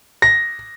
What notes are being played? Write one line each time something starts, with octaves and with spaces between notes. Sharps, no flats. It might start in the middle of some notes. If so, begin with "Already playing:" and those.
A#6